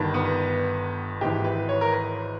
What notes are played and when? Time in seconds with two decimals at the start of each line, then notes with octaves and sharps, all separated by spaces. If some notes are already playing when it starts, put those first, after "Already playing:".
Already playing: G1 G2 D#3
0.14 B3
1.21 G#1 G#2 E3 G4
1.44 B4
1.69 C#5
1.81 A#4
1.92 B4